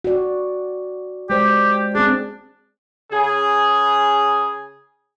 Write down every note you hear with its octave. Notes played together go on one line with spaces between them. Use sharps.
F#4 D5
G#3 G4 C5 D5
C4 D4 G#4
C#3 G#4